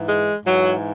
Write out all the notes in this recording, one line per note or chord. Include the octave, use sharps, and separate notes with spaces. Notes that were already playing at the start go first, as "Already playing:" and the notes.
Already playing: G#2 E3
G#3
G#2 E3 F#3